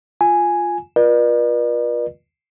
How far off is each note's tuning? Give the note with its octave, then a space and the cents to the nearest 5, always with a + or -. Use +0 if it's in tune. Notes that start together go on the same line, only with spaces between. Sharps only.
F4 +0 G#5 +0
F4 +5 B4 -45 D5 +45